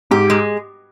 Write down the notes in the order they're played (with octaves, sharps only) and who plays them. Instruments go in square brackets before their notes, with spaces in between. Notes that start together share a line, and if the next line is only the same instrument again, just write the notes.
[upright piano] G#2 [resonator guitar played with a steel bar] G4
[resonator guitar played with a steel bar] G#3